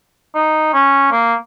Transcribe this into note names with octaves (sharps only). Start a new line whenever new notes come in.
D#4
C#4
A#3